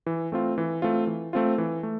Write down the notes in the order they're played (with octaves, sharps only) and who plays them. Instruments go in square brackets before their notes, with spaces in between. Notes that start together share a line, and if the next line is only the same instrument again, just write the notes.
[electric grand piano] E3
A3 C4 F4
E3
A3 C4 F4
E3
A3 C4 F4
E3
A3